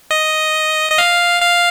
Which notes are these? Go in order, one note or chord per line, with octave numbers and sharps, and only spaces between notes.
D#5
D#5
F5
F5